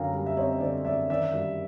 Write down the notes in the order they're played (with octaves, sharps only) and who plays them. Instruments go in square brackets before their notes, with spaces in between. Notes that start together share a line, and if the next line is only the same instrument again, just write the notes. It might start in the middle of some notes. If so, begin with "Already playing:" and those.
Already playing: [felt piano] F#2 D3 [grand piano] F5 G5 G#5 A#5
[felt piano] G3
[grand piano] E5
[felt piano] C4 [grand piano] C#5 D#5
[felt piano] D3 [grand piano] C5 D5
[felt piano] F#2 [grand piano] D5 E5
[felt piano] D#3 [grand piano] D5 E5
[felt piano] G2